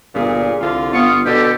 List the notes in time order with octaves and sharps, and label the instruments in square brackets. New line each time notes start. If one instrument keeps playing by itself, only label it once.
[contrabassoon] G1 [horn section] A#2 G#4
[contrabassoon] C2 [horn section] D3 F4
[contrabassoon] G1 [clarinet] B3 [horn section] F4 [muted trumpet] C#6
[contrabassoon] B2 [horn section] D3 [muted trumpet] G4 [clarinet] A4